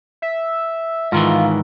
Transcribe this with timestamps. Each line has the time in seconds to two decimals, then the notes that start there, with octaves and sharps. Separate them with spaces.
0.22 E5
1.12 G#2 D#3 E3 F4